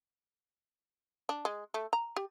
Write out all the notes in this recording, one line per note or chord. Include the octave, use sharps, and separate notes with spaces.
D4
G#3
A3
A#5
G4